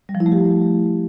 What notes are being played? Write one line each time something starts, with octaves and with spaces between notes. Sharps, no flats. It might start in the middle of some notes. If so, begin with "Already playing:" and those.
G3
F3
E4
A3
G4